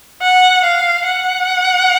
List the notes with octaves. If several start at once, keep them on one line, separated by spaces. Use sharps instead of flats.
F#5
F5
F#5